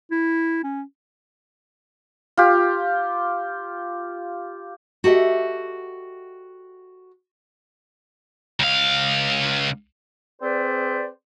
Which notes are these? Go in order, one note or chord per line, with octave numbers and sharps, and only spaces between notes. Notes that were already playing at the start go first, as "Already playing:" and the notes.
E4
C#4
F4 G4
F#4 G4 A4 D#5 E5
C#2 F5
C4 G#4 B4 C5 D5